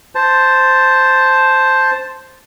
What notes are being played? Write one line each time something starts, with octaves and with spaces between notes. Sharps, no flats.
C5 A5